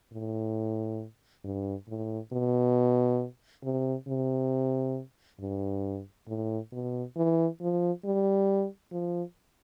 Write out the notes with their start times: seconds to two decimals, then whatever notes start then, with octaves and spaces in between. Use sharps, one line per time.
0.12 A2
1.44 G2
1.88 A2
2.33 B2
3.64 C3
4.08 C3
5.40 G2
6.28 A2
6.72 B2
7.17 E3
7.61 F3
8.05 G3
8.92 F3